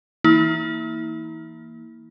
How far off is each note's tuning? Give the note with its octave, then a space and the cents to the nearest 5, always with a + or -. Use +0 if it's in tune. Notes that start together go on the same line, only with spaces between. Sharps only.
E3 +0 A#3 +0 E4 -45